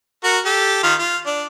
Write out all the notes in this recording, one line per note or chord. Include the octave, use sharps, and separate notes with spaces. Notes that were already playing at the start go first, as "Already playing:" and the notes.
F#4 A#4 F#5
G4 A4
D#3 F4
F4
D4